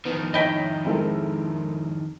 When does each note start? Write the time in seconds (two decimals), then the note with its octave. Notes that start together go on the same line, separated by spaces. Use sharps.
0.05 F2 D#3 B3
0.34 D#4 C#5 D#5 E5 G5 B5 A#6 B6
0.85 G#3 C4 E4 A4 A#4